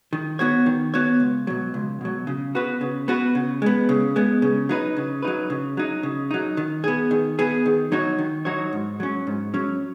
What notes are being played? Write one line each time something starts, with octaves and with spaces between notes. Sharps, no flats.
D#3
B3 F#4 C#5
D#3
B3 F#4 C#5
C#2
B2 F#3
C#2
B2 F#3
C#3
B3 F#4 B4
C#3
B3 F#4 B4
C#3
G#3 B3
C#3
G#3 B3
C#3
F#3 D#4 B4
C#3
F#3 D#4 B4
C#3
F#3 D#4
C#3
F#3 D#4
D#3
B3 G#4
D#3
B3 G#4
D#3
F#3 D#4 F#4 C#5
D#3
F#3 D#4 F#4 C#5
G#2
F#3 C#4
G#2
F#3 C#4